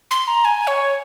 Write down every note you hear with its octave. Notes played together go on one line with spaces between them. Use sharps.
C6
A#5
G#5
C#5